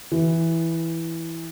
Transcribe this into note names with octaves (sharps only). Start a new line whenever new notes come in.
E3